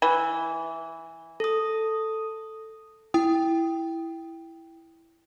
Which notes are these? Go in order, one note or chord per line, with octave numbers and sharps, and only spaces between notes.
E3
A4 D#6
E4 G5 D#6